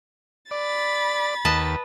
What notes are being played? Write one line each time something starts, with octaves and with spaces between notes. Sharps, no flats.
D5 B5 A6
D#2 B4 D#5 A5